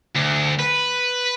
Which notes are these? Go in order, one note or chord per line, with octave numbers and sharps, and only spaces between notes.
D2
B4